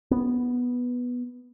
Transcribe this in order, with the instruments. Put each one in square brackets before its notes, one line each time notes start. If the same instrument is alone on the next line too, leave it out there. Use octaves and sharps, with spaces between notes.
[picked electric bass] B3